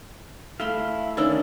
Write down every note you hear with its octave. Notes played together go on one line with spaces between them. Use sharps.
A3 E4 E5 F5 C6
D#3 C#4 D4 G#4 D5 E6